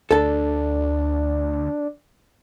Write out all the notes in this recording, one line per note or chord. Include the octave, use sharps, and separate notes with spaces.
D2 D4 A4 A5